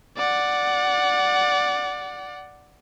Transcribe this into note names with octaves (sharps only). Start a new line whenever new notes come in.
D5 F#5